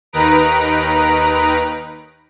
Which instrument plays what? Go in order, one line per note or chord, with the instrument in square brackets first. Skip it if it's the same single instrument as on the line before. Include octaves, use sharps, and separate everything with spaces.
[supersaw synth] D#2 D#3 D#4 B4 A#5 D7